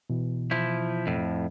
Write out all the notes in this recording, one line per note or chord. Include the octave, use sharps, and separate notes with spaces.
B2 E3
F3 E4
F2 A2